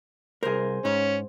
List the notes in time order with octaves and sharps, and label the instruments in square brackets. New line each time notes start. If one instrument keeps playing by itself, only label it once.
[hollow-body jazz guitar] C2 A#4 [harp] G#4 C5
[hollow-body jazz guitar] G#2 [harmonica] C#4